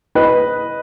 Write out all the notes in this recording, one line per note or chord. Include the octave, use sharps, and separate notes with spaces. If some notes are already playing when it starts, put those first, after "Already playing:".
B4 D#5